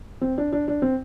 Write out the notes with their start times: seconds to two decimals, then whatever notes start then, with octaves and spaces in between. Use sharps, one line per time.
0.21 C4
0.38 D4
0.53 D4
0.68 D4
0.82 C4